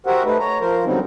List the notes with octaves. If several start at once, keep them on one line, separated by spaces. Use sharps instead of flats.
F#4 G4 A#4 C5 E5 F#5
A3 D#4 B4
C#5 A#5
F3 A#4 C5
D3 F#3 G3 B3 C4 D#4